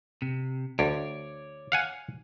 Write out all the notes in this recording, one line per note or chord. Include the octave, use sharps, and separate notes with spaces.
C3
D2 C#5 D5
F5 F#5 G#5